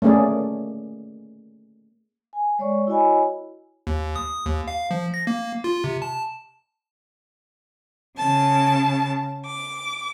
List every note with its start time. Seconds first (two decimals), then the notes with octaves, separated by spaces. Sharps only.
0.02 A3 A#3 C#4 G#4 D5
2.33 G#5
2.59 G#3 C#5 D5 C#6
2.87 E4 F#4 C#5 D#5 G#5 B5
3.87 D#2
4.16 D#6
4.46 D#2
4.68 F5
4.91 F3
5.14 A#6
5.27 A#3
5.64 F4
5.84 C3
6.02 A5
8.17 C#3 A5
9.45 D6